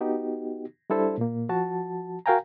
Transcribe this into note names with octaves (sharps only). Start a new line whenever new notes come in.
B3 D#4 F#4 G4
G3 D4 E4 A4 C5
A#2 A#3
F3 F#4 A5
F#4 A#4 F5 G5 G#5 A#5